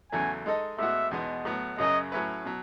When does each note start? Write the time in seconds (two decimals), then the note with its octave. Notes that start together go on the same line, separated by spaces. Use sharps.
0.12 E2 C#3 F#3 A3 G#5
0.46 G#3 D#4 A4 D#5
0.79 A2 G#3 B3 F#4 E5
1.11 E2 B2 G#3 B3 D#4
1.45 A2 F#3 B3
1.78 F#2 C#3 F#3 C#4 G#4 D#5
2.12 A2 F#3 C#4 E4 B4
2.45 B2 F#3